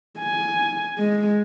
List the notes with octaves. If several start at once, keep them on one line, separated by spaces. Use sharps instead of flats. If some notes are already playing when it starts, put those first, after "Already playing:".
G#5
G#3